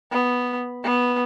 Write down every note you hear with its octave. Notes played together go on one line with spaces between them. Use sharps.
B3
B3